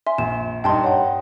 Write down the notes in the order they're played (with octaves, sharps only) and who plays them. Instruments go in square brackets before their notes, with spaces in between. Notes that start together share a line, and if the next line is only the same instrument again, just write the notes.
[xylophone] E5 G#5 C6
[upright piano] A#1 [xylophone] E7
[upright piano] G2 D#4 [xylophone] G5 A5 C6
[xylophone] C#5 F#5 G5